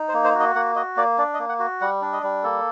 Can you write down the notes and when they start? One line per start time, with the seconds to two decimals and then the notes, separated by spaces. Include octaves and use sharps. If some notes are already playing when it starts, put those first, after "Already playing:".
Already playing: D#4
0.09 C5
0.14 A#3
0.24 C5
0.35 F#4 D#5
0.55 A#3 F#5
0.76 F#4 D#5
0.97 A#3 D5
1.18 D4 D5
1.34 D#5
1.39 A#3
1.49 F#5
1.59 F#4
1.81 G3 F#5
2.02 D4
2.13 D#5
2.23 G3
2.43 A#3 A4